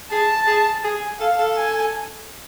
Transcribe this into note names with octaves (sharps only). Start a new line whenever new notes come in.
G#4 A5
G#4
G#4 G#5
A4 F5
A4
G#5